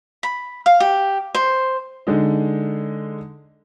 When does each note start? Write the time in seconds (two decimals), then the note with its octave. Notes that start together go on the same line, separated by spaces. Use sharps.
0.23 B5
0.66 F5
0.80 G4
1.35 C5
2.07 D3 G#3 D#4